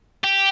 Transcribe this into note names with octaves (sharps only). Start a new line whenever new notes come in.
G4